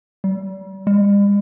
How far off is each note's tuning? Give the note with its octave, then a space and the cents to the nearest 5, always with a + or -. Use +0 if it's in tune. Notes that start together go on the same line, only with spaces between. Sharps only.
G3 -40
G3 +45